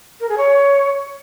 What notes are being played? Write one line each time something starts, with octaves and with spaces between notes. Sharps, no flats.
A#4
G#4
C#5